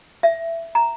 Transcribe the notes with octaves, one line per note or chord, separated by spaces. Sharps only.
E5
A#5